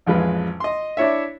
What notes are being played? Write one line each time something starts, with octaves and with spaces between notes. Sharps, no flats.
A1 F2 G#3 B4
D#5 C6
D4 E4 C#5 E5